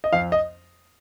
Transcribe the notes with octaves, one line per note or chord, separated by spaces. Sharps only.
D#5
F2 F5
D#5